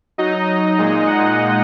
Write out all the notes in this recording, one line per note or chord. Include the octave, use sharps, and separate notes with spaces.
F#3 D#4 D#5
A#2 G#3 D#4
F#5